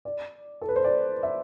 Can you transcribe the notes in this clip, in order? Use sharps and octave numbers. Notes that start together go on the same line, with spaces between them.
D5
A4
B4
C5
D5
E5